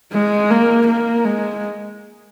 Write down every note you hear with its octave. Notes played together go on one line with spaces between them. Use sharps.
G#3
A#3
A#3
G#3